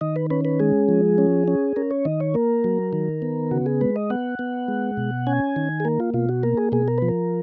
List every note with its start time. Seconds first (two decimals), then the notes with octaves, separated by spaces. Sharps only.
0.01 D#3 D#5
0.16 B4
0.30 C#4 B4
0.45 B4
0.60 G#3 G#4
0.89 F3
1.18 C#4
1.48 C#4
1.76 C#4 A#4
1.91 C#5
2.05 D#3 D#5
2.20 C#5
2.34 A#3 A#4
2.64 F#3
2.93 D#3
3.22 B3
3.51 C#3 F#4
3.66 G#4
3.81 G#3 B4
3.96 D#5
4.10 B3 F#5
4.39 B3
4.68 G#3
4.97 B2
5.27 C#4 G#5
5.56 D#3
5.80 G#4
5.85 A#3 A#4
6.00 F4
6.14 B2 F4
6.29 F#4
6.43 A#3 A#4
6.57 G#4
6.72 B2 G#4
6.88 A#4
6.98 F3 B4
7.08 A#4